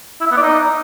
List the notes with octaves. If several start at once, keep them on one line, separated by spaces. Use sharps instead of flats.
E4
E5
B3
D5
D#4